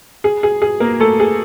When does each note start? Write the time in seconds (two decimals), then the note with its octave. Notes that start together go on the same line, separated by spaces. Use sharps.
0.24 G#4
0.43 G#4
0.62 G#4
0.80 A#3 A#4
1.00 A3 A4
1.20 G#4